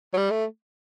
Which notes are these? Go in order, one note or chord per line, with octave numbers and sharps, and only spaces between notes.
F#3
G3
A3